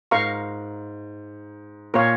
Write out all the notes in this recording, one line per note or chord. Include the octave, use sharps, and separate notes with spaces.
G#2 A#4 F5 A#5 C#6
A#2 A#4 C#5 F5